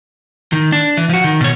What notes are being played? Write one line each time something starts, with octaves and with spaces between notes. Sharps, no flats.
D#3
D4
E3
F3 F#4
D#3
B2 C#5